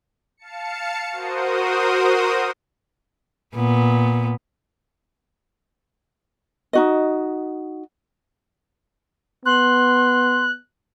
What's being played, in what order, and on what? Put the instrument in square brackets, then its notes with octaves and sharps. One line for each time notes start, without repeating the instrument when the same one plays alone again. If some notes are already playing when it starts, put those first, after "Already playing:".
[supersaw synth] F5 A5 C#7
F#4 A#4 C5 D#6
[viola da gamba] A#2 B3
[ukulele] D#4 F#4 D#5
[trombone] B3 [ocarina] C6 [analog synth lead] F#6